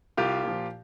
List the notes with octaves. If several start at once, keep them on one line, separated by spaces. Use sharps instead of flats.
C2 F4 G4
A#2 F3